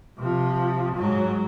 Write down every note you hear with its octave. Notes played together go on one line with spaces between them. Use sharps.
C3 F3
G#2 F#3